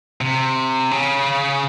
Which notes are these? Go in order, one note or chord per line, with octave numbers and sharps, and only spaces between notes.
C3
C#3